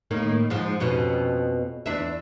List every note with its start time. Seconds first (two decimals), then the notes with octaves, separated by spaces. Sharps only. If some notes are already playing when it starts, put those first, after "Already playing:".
0.11 A2 D#3 A#3
0.50 G#2 F3
0.80 F2 B2 C#4
1.86 E2 D4 E5